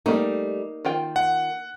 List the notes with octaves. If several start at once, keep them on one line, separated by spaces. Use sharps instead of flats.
G3 A3 A#3 D#4
D#3 F4 G5
F#5